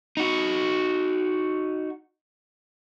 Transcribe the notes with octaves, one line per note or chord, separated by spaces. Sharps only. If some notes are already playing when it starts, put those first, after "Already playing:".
D#4 F#4